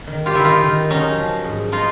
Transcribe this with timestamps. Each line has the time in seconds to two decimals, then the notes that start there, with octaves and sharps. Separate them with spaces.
0.07 D#3
0.26 F4 G4
0.35 D#3 E4
0.44 D#4 F4
0.63 D#3
0.90 F#3 C#4 D#4
1.18 F3
1.44 G#2
1.72 D#4 F4